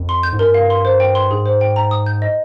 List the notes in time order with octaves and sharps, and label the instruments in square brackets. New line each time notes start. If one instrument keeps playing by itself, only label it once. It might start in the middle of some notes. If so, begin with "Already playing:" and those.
Already playing: [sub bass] F2
[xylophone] C6
G6
[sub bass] G#2
[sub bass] G2 [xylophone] A#4
[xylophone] F5
C6
C5
G5
C6
[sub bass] G#2 [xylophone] G#4
[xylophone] C5
G5
A#5
D#6
G6
D#5